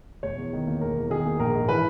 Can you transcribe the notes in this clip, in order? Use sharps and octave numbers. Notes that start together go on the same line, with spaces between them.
E1 C#5
E2
D#3
A#3
E1 A#4
E2
D#3 G#4
A#3
A#1 A#4
G#2
E3 B4